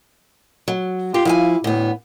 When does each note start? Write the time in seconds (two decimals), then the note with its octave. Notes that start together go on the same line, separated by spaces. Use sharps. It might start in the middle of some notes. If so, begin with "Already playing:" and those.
0.68 F#3
1.14 F4 G4
1.25 F3 E4 F5 G#5
1.64 D2 A2 B3